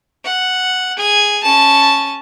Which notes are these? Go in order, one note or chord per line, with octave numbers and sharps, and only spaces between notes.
F#5
G#4 G#5
C#4 A5